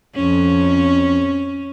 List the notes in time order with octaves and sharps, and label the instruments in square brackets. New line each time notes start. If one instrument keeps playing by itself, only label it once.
[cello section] F2 [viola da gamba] C#4